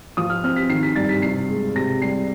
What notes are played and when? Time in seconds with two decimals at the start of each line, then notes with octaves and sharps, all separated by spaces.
0.17 F3 D#6
0.30 F6
0.44 C4 F6
0.56 B6
0.70 D#3 C7
0.83 B6
0.96 G2 A6
1.09 B6
1.22 C3 C7
1.49 G#3
1.75 C3 A#6
2.02 G3 C7